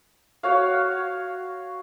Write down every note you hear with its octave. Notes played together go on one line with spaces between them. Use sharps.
F#4 C#5 F5